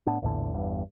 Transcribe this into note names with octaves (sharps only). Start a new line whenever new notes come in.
A2 B3 D4
A#1 E2 A2 D3
G1 E2 G2